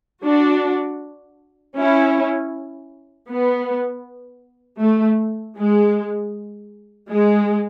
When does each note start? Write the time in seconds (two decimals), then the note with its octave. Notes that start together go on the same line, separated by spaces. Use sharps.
0.24 D4 F#4
1.76 C#4 E4
3.29 B3
4.80 A3
5.56 G#3
7.09 G#3